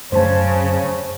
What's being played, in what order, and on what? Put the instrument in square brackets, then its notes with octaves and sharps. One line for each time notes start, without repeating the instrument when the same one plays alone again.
[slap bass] F#2 A3 C#4 [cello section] C#3 [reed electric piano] C5 A5